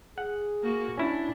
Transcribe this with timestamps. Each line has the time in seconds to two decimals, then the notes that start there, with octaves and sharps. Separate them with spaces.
0.18 G#4 F#5
0.63 A#3 F#4
0.97 C#4 D4 E4